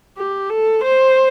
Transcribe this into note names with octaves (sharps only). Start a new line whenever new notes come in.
G4
A4
C5